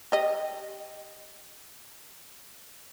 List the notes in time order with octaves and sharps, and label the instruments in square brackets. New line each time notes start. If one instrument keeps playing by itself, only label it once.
[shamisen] G4 D#5